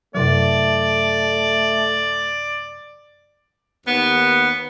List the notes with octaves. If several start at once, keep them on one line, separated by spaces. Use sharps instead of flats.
F#2 C3 F#3 A3 D5
D#2 B3